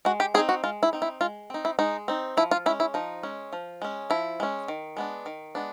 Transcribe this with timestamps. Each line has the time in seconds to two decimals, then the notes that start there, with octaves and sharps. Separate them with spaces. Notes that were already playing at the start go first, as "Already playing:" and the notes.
0.05 G#3 F#4
0.20 G4
0.34 C4 G#4
0.38 D#4
0.49 F#4
0.64 G#3 F4
0.83 E4
0.93 C4 D#4
1.02 E4
1.21 G#3 F4
1.50 C4 D#4
1.65 E4
1.79 G#3 D#4
2.08 C4 D#4
2.37 F3 E4
2.51 F4
2.66 C#4 E4
2.69 G#3
2.80 E4
2.94 F3 D#4
3.23 G#3 C#4
3.53 F3
3.82 G#3 C#4
4.10 F3 E4
4.40 G#3 C#4
4.68 D#3
4.97 G#3 B3 D4
5.26 D#3
5.55 G#3 B3 D4